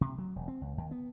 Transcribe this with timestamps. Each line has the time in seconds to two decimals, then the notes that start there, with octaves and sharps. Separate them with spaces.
0.01 C3
0.18 F#3
0.36 E1
0.48 C4
0.61 C#2
0.78 D#2
0.91 B3